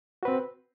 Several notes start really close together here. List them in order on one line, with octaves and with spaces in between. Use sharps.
F#4 B4 C4